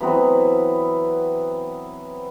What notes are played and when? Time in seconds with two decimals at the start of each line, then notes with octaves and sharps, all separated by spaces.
0.01 E3 F#3 B3 C4